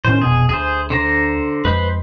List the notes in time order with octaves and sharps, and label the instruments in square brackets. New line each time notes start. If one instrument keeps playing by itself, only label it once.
[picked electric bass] A2 D#3 C#4 [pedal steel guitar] C5
[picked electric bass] F1 B2 [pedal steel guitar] G#4
[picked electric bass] D2 [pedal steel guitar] G#4 C5
[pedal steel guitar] D3 C5 A#5
[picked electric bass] F2 G#3 [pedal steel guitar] B4 C5 B5